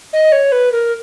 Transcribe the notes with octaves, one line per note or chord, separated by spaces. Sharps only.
D#5
C#5
B4
A#4